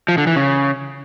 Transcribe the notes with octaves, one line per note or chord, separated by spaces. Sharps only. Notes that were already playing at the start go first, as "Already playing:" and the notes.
F3
D3
E3
C#3